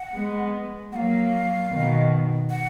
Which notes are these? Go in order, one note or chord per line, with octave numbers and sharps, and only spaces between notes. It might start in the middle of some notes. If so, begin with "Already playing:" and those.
Already playing: F#5
G#3 B3
F#3 A#3 F5 F#5
B2 D#3
F#5